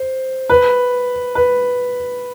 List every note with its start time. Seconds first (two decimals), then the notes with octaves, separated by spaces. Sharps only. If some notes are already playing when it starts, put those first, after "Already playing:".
Already playing: C5
0.50 B4
1.35 B4